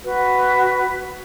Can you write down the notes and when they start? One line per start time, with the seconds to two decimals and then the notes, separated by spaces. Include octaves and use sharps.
0.04 F#4 B4